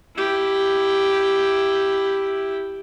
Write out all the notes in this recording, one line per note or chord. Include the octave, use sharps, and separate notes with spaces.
E4 G4